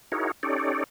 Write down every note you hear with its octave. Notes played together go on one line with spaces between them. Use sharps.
D#4 E4 F#4 G#4 A#4 C#5
C#4 D#4 G4 A4 C#5 D5